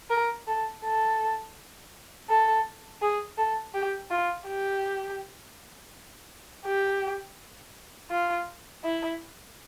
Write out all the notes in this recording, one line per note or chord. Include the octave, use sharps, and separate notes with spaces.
A#4
A4
A4
A4
G#4
A4
G4
F4
G4
G4
F4
E4